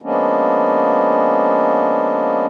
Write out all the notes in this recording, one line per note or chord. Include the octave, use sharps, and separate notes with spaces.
F3 G#3 A#3 B3 C#4 D4